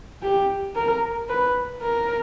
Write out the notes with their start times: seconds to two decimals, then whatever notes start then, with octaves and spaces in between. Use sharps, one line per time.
0.22 G4
0.76 A#4
1.29 B4
1.82 A#4